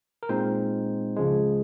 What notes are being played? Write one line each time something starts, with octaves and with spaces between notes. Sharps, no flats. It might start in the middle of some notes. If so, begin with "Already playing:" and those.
A#4
A#2 G#3 C4 D#4 C5
C#2 C#3 F3 G#3